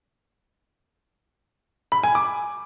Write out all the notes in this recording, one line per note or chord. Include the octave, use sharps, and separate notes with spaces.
B5
G#5
D6